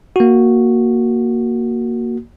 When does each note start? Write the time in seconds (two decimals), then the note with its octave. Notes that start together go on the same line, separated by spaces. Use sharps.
0.16 A#3 F#4